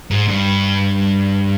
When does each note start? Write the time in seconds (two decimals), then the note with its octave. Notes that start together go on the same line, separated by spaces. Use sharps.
0.11 G#2
0.28 G2